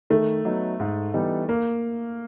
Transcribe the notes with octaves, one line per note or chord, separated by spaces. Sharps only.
D#3 A3
F#3 B3 D#4
G#2
E3 G3 B3 D#4
A#3